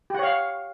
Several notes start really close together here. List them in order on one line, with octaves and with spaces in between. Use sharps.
G4 F#5 C#5 F5